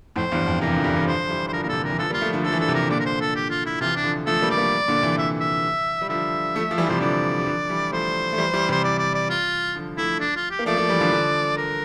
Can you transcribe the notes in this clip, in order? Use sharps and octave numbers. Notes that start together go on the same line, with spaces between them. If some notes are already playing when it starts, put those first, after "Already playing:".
F2 A2 C5
E2 G2
F2
C3 E3 A#4
D3 F3
E3 G3
C3 E3
D3 F3 C5
E3 G3
C5
D3 F3 A#4
A#2 A#4
C3 A4
D3 A#4
E3
D3 F3 A4
G3 A#3
F4
F3 A3
D3 F3
F3 A4
E3
D3 A4
C3 E3
A#4
E3
A#2 D3 D5
A#4
C5
A4
G4
F4
E4
C3 E3 F4
D4
D3 F3
F3 A3 A4
G3 A#3
D5
G3 A#3
A#2 D3
C3 E3
E5
E5
G3
D3 F3 E5
F3 A3
F3
E3 G3
F3
C3 E3 C5
D3 F3 D5
G3
D3 F3
E3 G3
F3 A3 C5
A3
E3 G3
E3 G3
C3 E3 C5
D5
D5
D5
F4
D3 F3
F3 A3 E4
D4
F4
G4
A#3
F3 A3 D5
F3 A3
E3 G3
D3 F3
D3 F3
A#4